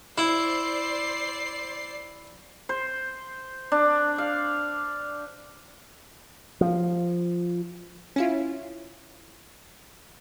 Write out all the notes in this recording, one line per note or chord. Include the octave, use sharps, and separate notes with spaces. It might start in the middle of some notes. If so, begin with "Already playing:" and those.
E4 C5 D5 C7
C5
D4
F5
F3
C#4 E4 F4